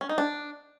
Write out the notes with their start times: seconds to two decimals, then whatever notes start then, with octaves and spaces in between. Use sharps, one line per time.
0.01 C#4
0.09 D#4
0.18 D4